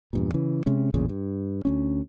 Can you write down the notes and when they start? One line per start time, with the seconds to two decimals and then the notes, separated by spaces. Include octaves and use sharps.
0.13 E2 G2 A#2
0.34 C#3 E3
0.66 C3 G#3 C#4
0.94 A1 E2 A#2 C#3
1.09 G2
1.65 D2 B3 C#4